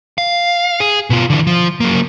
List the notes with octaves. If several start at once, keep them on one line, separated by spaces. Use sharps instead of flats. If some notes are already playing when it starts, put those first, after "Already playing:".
F5
G#4
B2 F4
D3 E3
F3
F#3 A#3